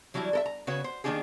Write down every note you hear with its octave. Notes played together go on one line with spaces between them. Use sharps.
E3 F#3 G3 D4 E4
A4 A#4 E5
A#5
C#3 F#4 B4 C#5
C5
D#3 A#3 C#4 D4 G4 G#4